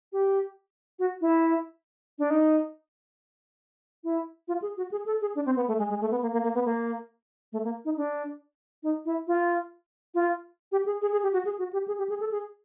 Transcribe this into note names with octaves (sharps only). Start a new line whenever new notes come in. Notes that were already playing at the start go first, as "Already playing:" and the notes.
G4
F#4
E4
D4
D#4
E4
F4
G#4
F#4
G#4
A4
G#4
D4
C4
B3
A3
G#3
G#3
A3
B3
A#3
A#3
A#3
B3
A#3
A3
A#3
D#4
D4
D#4
E4
F4
F4
G4
G#4
G#4
G#4
G4
F#4
G#4
F#4
G4
G#4
G4
G#4
A4
G#4